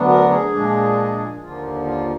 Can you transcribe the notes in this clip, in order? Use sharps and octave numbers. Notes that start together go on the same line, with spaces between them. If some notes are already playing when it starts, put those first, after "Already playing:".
Already playing: D2 D3 F#3 B3 D4
A#4
G#4
A#2 F3 G#3 D4
D#2 D3 F3 A#3 F4
F4